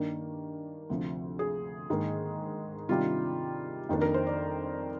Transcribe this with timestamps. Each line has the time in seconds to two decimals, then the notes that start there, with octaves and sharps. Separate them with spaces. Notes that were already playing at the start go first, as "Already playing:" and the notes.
Already playing: G2 D#3 A#3 D4
0.90 D2 C3 F3
1.39 G#4
1.90 G#2 D#3 A#3
2.89 C3 D#3 G3 D4 F4
3.89 F2 D#3 A#3 D4
4.01 A#4
4.14 C5
4.27 D5